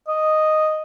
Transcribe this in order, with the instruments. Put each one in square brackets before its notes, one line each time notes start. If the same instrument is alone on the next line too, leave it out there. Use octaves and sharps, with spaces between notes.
[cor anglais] D#5